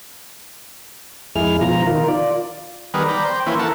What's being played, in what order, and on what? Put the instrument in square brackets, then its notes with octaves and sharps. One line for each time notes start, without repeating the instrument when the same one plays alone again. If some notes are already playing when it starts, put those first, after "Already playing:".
[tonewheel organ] F2 G#3 E4 G#4 F6
B2 F3 F4 A#5
D#3 F4 A#4
F4 D5
[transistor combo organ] D#3 G3 B3 G#4 A#4 B4
D5 G5 A#5 B5
C5 G5
E3 A#3 C#4 E4 B4 C5
A4 A#4 E5 F#5 A5